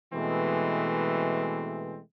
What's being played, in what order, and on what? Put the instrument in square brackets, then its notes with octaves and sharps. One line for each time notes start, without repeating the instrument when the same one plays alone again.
[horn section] B2 E3 G#3 A3 C4